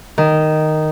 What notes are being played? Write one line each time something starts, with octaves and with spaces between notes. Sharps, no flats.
D#3